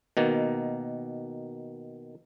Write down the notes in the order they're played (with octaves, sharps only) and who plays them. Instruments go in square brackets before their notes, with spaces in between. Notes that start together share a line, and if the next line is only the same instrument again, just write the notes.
[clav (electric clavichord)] B2 D#3 A#3